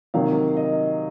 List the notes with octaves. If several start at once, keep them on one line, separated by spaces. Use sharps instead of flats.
C3 D#3 F#3 A#3 F5
D#5